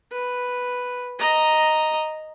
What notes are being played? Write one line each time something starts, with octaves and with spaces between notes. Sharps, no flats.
B4
D#5 A#5